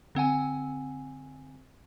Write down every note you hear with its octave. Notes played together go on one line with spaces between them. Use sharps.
D3 C4 F#5 G#5